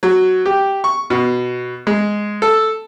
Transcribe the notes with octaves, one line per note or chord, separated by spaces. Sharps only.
F#3
G4
C#6
B2
G#3
A4